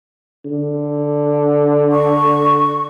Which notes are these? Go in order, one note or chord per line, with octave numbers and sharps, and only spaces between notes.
D3
C#6